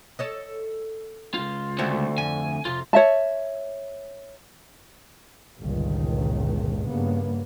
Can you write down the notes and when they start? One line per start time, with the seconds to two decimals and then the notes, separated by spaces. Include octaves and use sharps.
0.19 A4 C#5 D#5
1.34 C#2 F4
1.79 D2 A3 C4 F#4
2.18 F2 G#5
2.65 F2 C3 F4
2.93 C#5 E5 A5
5.61 G1 C#2 A#2 D#3
6.88 G2 C#3 A#3 B3